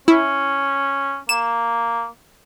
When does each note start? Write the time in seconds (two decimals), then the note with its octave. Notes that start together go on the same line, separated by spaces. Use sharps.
0.08 C#4 E4
1.29 A#3 E7